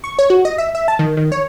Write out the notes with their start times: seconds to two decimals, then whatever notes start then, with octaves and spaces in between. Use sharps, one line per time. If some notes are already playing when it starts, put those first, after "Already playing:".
0.04 C#6
0.19 C#5
0.30 F#4
0.45 D#5
0.58 E5
0.75 E5
0.88 A5
0.99 D#3
1.17 D#3
1.32 C#5